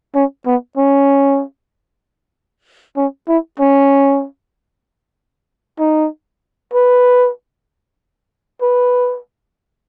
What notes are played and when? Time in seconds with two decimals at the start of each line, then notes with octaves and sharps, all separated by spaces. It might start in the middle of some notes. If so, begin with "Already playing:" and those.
0.15 C#4
0.46 B3
0.77 C#4
2.97 C#4
3.28 E4
3.60 C#4
5.80 D#4
6.74 B4
8.62 B4